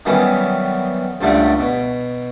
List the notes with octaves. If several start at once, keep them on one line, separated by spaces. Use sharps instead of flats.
D#3 E3 F#3 G3 B3 C#4
C#2 G2 G3 A3 D5 F#5
B2